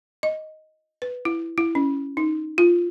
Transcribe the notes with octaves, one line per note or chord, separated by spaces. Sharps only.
D#5
B4
E4
E4
C#4
D#4
F4